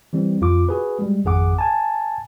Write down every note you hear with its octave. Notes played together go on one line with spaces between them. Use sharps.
E3 G3 C4
F2 F4 D6
F#4 G#4 B4
G3 G#3
G#1 F2 G#4 F#5 D6
G#5 A5